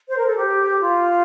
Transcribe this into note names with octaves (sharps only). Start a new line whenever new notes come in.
C5
A#4
A4
G4
F4